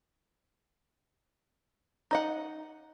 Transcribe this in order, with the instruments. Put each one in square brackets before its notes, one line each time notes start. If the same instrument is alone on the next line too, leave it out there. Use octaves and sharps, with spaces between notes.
[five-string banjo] D#4 D#5 F#5